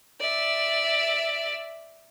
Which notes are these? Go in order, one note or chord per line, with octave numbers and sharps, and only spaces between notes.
D5 E5